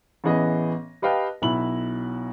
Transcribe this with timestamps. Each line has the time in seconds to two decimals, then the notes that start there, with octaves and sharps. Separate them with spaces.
0.24 A1 E3 B3 G#4 B4 D#5
1.02 G4 B4 D#5 F5 G5 A5
1.42 B1 B2 E4 E5 B5 F#7